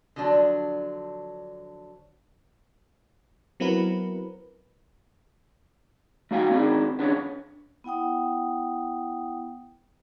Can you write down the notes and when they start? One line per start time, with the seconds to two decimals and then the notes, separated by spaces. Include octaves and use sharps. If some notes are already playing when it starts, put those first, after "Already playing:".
0.16 D3 F3 F#3 D4
3.60 F#3 B3 C4 E4 A#4 B4
6.31 A3 D#4 F#4 F5 G5 G#5
6.51 C4 D4 D#4 G#4
6.99 B3 C#4 D4 G#4 A#4 C#5
7.84 B3 E4 F#5 G5 D#6